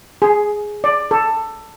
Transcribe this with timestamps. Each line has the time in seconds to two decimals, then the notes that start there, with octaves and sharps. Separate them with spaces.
0.22 G#4
0.84 D5
1.11 A4